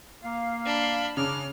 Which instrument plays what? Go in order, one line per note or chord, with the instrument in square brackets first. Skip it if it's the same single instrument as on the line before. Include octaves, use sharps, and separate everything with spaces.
[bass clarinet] A#3 [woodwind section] F5
[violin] D4 B5
[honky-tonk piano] C#3 [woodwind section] D4 A#5 D6 [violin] F6